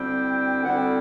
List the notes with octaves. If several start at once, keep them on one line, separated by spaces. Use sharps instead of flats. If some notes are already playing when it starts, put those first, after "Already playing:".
Already playing: D2 D3 G3 C4 E4 G5
D2 D3 G3 C4 E4 F#5
G5